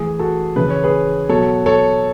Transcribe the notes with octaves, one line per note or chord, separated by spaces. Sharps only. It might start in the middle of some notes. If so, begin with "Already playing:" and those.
Already playing: A2 E3 G#4
F#4 A4
C#3 E3 B4
C#5
G#4 B4
B2 F#3 A4 C#5
A4 C#5